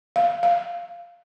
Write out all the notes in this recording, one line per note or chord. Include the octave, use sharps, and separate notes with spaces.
F5
F5